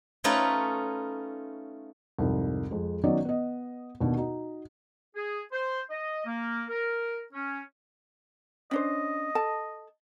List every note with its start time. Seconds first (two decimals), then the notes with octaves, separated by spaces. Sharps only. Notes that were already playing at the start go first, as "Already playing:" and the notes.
0.24 A3 C#4 D#4 F4 B4 C#5
2.19 C2 F2 G#2
2.71 F2 G#3
3.03 D#3 F#3 B3 C#4 D5 D#5
3.25 B3 D#5
4.00 D#2 B2 D4
4.17 D#4 F#4
5.16 G#4
5.52 C5
5.90 D#5
6.26 A#3
6.69 A#4
7.33 C#4
8.71 C#4 D4 C5 D#5
9.35 A4 A5